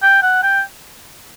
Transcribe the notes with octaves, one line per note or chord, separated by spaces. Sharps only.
G5
F#5
G5